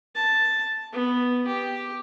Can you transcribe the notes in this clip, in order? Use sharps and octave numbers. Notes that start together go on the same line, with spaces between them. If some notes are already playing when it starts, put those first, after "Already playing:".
A5
B3
G4